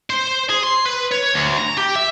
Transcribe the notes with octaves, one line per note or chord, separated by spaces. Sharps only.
C5
G#4
C6
B4
C#5
D2
A#5
G4
E5